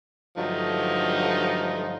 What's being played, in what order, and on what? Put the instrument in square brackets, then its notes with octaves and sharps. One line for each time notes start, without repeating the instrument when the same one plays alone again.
[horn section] G2 D3 F3 F#3 A3 D#4